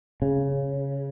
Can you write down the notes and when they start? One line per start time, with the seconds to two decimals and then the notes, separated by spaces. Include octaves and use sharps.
0.22 C#3